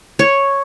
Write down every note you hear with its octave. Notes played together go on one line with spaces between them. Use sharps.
C#5